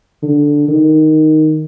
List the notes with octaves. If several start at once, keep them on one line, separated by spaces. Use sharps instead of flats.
D3
D#3